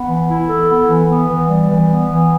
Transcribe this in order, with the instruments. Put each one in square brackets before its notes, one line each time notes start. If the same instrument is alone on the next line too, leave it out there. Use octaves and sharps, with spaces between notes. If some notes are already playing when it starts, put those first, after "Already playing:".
Already playing: [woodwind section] B3
E3
E4
A4
B3
E3
B3
E3
G3
E3
B3
E3